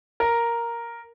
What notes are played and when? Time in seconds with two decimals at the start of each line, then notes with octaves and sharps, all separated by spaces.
0.20 A#4